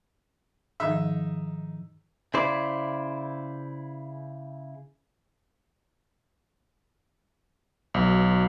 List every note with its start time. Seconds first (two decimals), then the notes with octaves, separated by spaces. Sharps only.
0.80 G#2 D#3 F3 D#4 E5
2.34 C#3 E4 C5 D5
7.94 B1